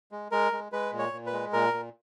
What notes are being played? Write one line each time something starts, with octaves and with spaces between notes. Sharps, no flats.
G#3
G#3 A#4
G#3
G#3 B4
A#2
C#5
A#2
B4
G#3
A#2 A#4
A#2